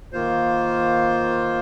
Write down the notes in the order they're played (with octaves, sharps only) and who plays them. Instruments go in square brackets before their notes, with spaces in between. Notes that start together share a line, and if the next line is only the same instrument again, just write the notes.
[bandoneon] D#3 A#3 F4 C5